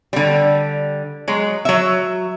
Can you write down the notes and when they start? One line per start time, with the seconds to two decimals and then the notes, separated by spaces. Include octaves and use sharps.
0.13 D3 G3
1.28 F#3 G#3
1.65 F#3 E5